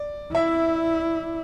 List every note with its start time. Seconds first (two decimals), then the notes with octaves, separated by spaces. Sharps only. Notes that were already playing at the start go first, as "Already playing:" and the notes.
Already playing: D5
0.34 E4 E5